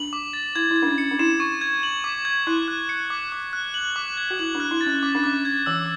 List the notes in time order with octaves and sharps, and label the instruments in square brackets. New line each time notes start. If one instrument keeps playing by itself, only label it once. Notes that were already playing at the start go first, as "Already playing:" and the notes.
Already playing: [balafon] D4 [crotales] F#7
[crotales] D6
A6
[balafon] E4 [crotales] G#6
[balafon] E4
[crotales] G#6
[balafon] D4
C#4
[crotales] C#7
[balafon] D4
[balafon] E4 [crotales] E7
[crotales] C#6
G#6
F#7
D6
G#6
[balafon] E4 [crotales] F#6
[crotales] F#6
C#7
D6
D6
F#6
F#7
D6
G#6
[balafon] F#4
[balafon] E4 [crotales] F#7
[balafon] D4
[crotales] F#6
[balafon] E4
[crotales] A6
[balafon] C#4
[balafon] C#4 [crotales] D6
[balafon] D4
[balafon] C#4 [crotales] D6
[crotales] G#6
[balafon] E3 [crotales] E6